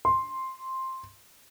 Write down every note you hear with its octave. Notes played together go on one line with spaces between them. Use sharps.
C6